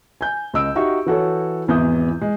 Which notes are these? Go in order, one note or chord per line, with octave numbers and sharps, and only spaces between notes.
G#5 G6
C#2 D#5 E6 D7
D#4 F#4 G4 E5 C#6
E3 F#4 A4 C#5
G#1 E2 E3 E5 D#6 G6
G#3